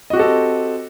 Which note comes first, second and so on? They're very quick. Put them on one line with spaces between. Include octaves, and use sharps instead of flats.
D#5 F#4 G4 A4 C4